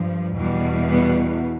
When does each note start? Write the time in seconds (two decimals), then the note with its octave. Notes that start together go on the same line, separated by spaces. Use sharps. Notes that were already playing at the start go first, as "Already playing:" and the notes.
Already playing: G2 F3
0.34 E2 B2 G3
0.89 G3 B3